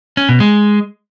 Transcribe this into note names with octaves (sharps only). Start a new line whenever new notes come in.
C#4
B2
G#3